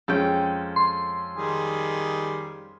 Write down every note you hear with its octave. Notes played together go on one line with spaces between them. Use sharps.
F2 G#3 C#4 A4 G5
C6
D#3 G3 G#4